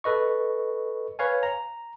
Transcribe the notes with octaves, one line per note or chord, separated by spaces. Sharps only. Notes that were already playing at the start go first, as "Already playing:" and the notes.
A4 B4 D#5 C#6
B4 C#5 F5 G#5
A#5